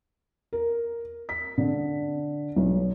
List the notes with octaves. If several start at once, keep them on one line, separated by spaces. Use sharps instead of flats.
A#4
B6
D3
B1